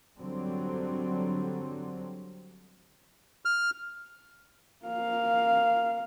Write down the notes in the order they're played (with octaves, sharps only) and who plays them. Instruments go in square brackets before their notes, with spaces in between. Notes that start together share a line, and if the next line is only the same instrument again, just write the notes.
[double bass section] D3 F#3 G3 C4
[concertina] F6
[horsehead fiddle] A#3 F5